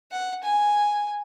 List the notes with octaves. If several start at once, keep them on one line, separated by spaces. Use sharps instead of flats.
F#5
G#5